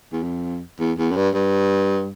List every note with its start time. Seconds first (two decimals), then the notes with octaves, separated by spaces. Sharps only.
0.13 E2
0.23 F2
0.80 E2
0.98 E2
1.11 F#2
1.16 G2
1.34 G2